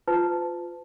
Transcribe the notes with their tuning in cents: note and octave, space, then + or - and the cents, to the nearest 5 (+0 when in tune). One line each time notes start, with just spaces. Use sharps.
F4 +5 B4 +45 A5 -5